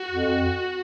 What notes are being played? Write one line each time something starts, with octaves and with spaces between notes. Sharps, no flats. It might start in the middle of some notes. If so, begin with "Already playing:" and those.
Already playing: F#4
F2